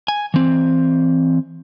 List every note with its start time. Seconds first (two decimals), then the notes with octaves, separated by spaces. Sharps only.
0.08 G#5
0.34 E3 C4